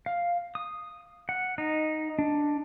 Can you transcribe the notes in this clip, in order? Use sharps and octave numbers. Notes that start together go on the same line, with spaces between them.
F5
D#6
F#5
D#4
D4